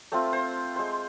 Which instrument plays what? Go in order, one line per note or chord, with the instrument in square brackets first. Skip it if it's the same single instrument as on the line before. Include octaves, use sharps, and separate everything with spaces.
[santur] A3 C4 F4
C5
G#3 C5